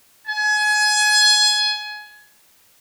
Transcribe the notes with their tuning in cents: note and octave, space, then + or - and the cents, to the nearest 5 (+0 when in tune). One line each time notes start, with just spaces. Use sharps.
G#5 +25